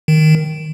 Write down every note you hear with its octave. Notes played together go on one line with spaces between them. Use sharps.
D#3